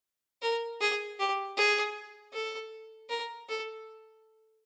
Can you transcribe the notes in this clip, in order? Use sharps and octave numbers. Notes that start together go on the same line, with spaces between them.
A#4
G#4
G4
G#4
A4
A#4
A4